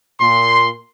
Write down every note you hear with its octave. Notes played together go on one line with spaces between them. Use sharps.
A#2 C6